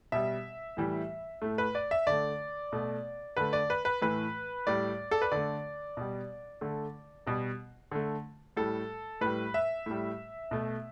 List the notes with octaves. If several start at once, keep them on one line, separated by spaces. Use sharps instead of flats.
B2 G3 E5
A2 E3 G3
A2 A3
B4
D5
E5
D3 A3 D5
B2 A3
D3 A3 B4
D5
B4
B4
A2 E3 A3 B4
A2 G3 D5
A4
B4
D3 A3 D5
B2 G3
D3 A3
B2 G3
D3 A3
A2 G3 A4
A2 G3 B4
E5
A2 G3
B2 A3